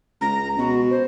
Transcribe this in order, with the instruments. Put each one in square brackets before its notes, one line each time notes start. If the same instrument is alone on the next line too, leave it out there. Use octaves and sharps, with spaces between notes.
[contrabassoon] C#2 [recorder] A#5
[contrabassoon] B2 [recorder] F#4
[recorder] C5